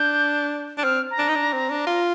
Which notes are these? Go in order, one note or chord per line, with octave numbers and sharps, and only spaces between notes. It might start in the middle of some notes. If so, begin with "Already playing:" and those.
Already playing: D4 G6
D4
C4 F6
A#5
D4
D#4
D4
C4
D4
F4